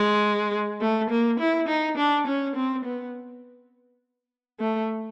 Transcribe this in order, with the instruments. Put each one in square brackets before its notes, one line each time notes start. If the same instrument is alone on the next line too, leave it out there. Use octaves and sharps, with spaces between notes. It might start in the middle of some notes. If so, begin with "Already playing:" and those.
Already playing: [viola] G#3
A3
A#3
E4
D#4
D4
C#4
C4
B3
A3